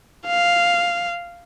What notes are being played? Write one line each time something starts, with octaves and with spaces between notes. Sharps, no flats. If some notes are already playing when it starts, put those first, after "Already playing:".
F5